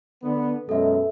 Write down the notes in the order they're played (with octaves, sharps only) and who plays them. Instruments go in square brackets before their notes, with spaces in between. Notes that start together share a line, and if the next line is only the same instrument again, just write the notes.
[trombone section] D3 B3
[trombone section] F#2 B2 G#3 [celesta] A4 E5